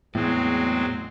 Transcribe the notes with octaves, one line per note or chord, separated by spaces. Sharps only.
E2 A2 F#3 G#3 C4